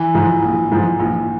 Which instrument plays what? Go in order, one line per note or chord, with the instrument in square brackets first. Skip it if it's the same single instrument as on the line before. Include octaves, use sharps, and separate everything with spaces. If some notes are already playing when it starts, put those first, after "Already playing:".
Already playing: [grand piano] E3
[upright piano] G#2 F3
A#1
G#2 F3
A#1